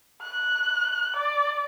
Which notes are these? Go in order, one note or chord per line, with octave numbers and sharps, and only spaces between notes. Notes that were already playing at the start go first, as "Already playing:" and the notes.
F#6
D5